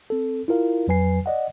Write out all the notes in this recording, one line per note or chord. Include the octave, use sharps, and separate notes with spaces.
C4 A4
E4 F4 A#4 F5
F2 F#3 B4 G#5 C7
D5 D#5 F#5